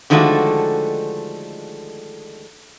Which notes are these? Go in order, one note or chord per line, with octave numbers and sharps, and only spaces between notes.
D3 D#3 F3 G#3 A3 F#4